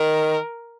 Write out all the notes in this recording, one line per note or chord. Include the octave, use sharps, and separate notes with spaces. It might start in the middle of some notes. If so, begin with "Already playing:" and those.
Already playing: D#3 A#4